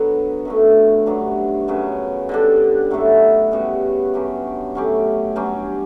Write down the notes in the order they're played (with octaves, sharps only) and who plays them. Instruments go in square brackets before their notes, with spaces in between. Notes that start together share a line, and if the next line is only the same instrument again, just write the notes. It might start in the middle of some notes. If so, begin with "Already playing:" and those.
Already playing: [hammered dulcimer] D3 F#3 B3
F#2 D3 A3
G2 F#3 B3 D4
F#2 C#3 F#3 B3
D3 G3 D4
A2 F#3 A3 E4
C#3 G3 B3 F#4
G2 F#3 C#4 G4
A2 F#3 C#4 G4
G2 F#3 C#4 G4